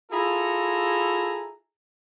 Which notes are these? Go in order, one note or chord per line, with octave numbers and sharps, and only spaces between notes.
E4 F4 G#4 A4 A#5